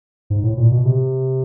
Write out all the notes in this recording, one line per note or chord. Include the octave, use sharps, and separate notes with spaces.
G#2
A2
A#2
B2
C3